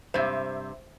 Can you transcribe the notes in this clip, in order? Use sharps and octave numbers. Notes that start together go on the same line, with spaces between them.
G2 C3 C5 E5